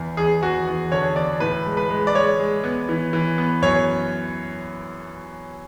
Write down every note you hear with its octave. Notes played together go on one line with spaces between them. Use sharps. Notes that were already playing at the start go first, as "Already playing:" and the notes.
Already playing: E2
E2 G#4
E2 F#4
E2
D3 C#5
E2 D5
A2 B4
G#3
B4
G#3
D5
G#3 C#5
G#3
B3
E3
E3
B3
F#2 C#5